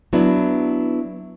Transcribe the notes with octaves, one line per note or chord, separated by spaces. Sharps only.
F#3 B3 D4 E4